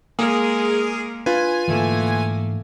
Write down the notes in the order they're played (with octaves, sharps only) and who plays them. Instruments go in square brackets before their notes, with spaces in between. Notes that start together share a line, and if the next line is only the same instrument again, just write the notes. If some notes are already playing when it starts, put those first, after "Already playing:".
[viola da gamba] G#3 A#4 [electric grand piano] A#3 [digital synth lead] G#4
[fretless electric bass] D4 [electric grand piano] F4 B4 [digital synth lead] G#5
[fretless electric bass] G#2 D3 E3 [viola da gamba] A3 A#3